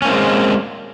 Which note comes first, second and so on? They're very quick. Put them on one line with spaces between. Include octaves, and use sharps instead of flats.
C#4 A#3 C4 G#3